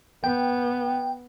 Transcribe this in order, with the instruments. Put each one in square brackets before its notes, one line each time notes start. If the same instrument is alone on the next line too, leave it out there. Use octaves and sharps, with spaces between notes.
[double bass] B3 [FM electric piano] G5